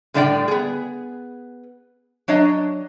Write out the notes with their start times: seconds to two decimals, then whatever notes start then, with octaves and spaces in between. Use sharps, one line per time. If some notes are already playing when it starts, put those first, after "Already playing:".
0.14 A2 D3 G3 D5 F#5 G5
0.48 B3 G#4
2.28 F#3 D4 C#5 D#5